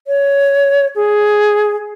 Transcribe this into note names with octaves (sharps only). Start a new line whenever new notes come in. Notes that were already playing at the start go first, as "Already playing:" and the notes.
C#5
G#4